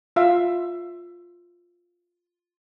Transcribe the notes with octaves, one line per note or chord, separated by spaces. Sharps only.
F4 E5 F5